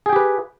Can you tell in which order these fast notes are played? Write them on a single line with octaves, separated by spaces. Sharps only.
G#4 G5 G4 B4